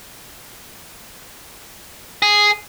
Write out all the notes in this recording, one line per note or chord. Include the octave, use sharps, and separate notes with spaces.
G#4